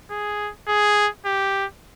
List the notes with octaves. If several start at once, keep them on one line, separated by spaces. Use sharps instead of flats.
G#4
G#4
G4